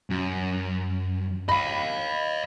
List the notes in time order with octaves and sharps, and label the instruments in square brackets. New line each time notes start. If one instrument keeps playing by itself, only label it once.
[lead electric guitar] F#2
[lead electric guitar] D#5 F5 [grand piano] B5